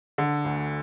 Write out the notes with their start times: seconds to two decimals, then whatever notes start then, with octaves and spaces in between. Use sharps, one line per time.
0.18 D3
0.45 D2